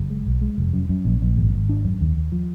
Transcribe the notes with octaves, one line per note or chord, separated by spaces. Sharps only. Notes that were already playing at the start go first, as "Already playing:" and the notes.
Already playing: F#1
G#3
B1
G#3
F1
F#2
F#2
A#1
A#1
G#1
G#1
D4
F#2
D#2
D#2
F3